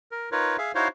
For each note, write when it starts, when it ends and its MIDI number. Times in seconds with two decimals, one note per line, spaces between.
0.12 0.29 70
0.32 0.57 63
0.32 0.57 65
0.32 0.57 70
0.32 0.57 71
0.32 0.57 73
0.58 0.72 68
0.58 0.72 76
0.58 0.72 77
0.75 0.88 63
0.75 0.88 64
0.75 0.88 66
0.75 0.88 72
0.75 0.88 73
0.75 0.88 77